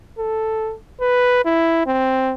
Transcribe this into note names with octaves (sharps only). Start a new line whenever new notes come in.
A4
B4
E4
C4